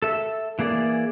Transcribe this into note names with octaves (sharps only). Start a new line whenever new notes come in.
A4 E5
E3 A#3 G#4 D5